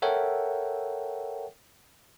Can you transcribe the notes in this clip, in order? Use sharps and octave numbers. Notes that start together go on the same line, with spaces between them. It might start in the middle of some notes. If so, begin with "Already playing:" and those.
A4 A#4 C#5 E5 F#5 G5